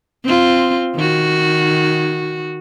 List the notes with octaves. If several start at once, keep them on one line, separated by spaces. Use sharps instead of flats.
C4 F4
D#3 F#4